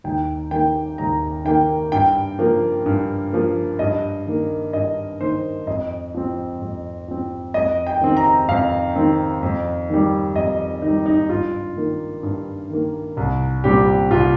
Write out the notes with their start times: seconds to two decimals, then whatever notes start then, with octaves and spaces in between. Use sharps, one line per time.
0.04 D#2 G5
0.51 D#3 A#3 G5
0.98 D#2 A#5
1.45 D#3 A#3 G5
1.92 G2 G5
2.39 F3 A#3
2.86 G2
3.33 F3 A#3
3.79 G2 D#5
4.26 D#3 A#3
4.73 G2 D#5
5.20 D#3 A#3 C5
5.67 F2 D#5
6.14 F3 C4
6.62 F2
7.08 F3 C4
7.54 F2 D#5
7.87 G5
8.01 D#3 C4
8.17 A#5
8.48 F2 F5
8.96 D#3 C4
9.42 F2
9.90 D#3 G3
10.35 F2 D#5
10.82 D#3 D#4
10.87 G3
11.06 D#4
11.29 G2 F4
11.77 D#3 A#3
12.23 G2
12.70 D#3 A#3
13.17 C2
13.64 A#2 G3 C4 G4
14.11 C2 F4